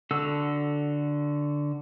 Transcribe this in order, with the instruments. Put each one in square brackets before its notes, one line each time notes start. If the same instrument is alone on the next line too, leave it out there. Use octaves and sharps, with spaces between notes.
[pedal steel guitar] D3 F#4 A4 E6